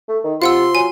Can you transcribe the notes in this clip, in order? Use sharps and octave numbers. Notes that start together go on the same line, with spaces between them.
A3
D#3
C3 F4 F5 F#5 C6 E6
F#3 G#5